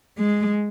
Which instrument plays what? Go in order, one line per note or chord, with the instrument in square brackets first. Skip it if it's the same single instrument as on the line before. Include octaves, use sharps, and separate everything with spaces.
[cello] G#3